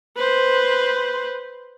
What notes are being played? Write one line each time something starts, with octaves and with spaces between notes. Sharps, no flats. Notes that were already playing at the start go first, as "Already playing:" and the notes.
B4 C5